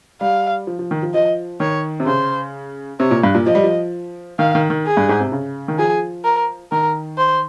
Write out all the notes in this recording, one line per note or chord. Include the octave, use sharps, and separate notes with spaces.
G3 F5
F3
F3
D#3
F3
F3 D#5
D#3 C#5
C3
C#3 C5
C3 C#5
A#2
G2
A#2
F3 D#5
G3
F3
D#3 F5
D#3
D#3
G#4
G2
G#2
C3
C#3
D#3
F3 G#4
A#4
D#3 A#4
C5